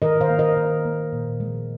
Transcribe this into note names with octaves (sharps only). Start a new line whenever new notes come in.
D#3 A#4 D#5
C5 F5
A#3
A#4 D#5
D#3
A#3
A#2
F3 G#3